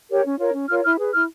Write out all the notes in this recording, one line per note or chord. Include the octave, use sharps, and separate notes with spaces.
G4 A#4 C#5
C#4
F4 A#4 C#5
C#4
F4 A#4 C#5 F6
E4 F6
G#4 B4
E4 F6